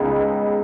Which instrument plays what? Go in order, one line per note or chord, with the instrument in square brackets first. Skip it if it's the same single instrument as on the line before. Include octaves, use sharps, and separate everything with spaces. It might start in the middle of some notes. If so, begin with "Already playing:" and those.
Already playing: [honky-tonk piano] C#2 C#3 G#3 B3 D#4